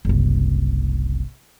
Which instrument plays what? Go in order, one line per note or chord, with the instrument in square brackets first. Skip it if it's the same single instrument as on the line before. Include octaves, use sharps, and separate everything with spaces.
[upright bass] F#1 C2